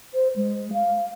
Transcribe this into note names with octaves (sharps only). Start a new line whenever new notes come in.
C5
G#3
F5